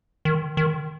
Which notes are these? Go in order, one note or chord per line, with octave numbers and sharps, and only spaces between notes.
D#3
D#3